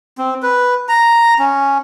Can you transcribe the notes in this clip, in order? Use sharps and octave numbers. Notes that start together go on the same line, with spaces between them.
C4
B4
A#5
C#4